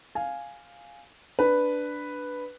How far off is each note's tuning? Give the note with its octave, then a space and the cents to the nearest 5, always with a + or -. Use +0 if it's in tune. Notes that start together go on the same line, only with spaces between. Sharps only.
F5 +0 G#5 +0
D4 +0 B4 +0